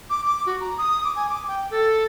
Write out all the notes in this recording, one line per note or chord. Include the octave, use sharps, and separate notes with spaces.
D6
D6
F#4
A#5
D#6
D6
G#5
D6
G5
A4